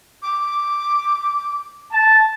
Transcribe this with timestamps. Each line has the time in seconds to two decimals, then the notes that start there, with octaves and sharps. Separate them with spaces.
0.22 D6
1.92 A5